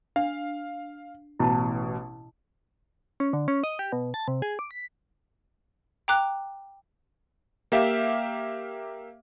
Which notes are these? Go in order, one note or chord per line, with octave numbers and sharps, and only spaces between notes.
D4 F5
A1 B2 E4 A5
C#4
D3
C#4
D#5
G4
B2
A5
C3
G#4
D6
B6
G5 A#5 D6 F#6
A#3 G4 E5 F5